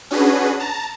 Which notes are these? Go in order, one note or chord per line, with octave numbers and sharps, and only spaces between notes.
C#4 D4 F#4 G#4 B4
A5 A#5